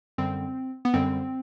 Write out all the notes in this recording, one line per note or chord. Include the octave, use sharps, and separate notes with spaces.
F#2 D3 G3 C4
B3
F#2 D3 G3 C4